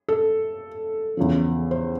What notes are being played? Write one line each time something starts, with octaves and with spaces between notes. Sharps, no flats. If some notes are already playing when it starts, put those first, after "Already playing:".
A4
E2 C#3 F3
C5